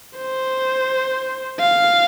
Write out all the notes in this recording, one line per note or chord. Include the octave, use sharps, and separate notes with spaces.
C5
F5